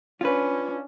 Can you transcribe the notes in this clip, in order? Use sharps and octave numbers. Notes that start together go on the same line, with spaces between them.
C#4 D4 F4 B4